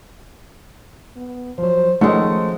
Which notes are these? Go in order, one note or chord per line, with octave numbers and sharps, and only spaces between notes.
B3
F3 F#3 C5
D#3 F3 G#3 A3 C#4 C5 F#5